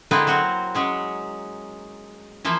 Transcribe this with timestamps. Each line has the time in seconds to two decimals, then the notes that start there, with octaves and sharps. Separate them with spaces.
0.11 D3 G#3 A#3 C4 E4 B4
0.27 F#3 C4 F#4
0.75 F#3 G#3 C#4
2.45 E3 F3 A#3 E4